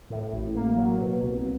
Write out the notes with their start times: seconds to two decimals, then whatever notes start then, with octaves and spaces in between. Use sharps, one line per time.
0.10 A2
0.32 A1
0.55 A#3
0.76 F#3
1.00 B2
1.22 C2